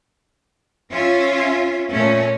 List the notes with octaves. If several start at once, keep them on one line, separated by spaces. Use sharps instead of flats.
C#4 F4 E5
A#2 A3 C#4